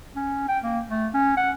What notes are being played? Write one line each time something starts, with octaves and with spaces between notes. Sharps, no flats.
C#4
G5
A#3
A3
C#4
F#5